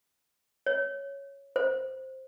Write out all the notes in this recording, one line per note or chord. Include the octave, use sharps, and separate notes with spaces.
C#5
C5